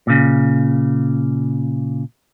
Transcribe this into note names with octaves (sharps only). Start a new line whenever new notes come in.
A#2 C#3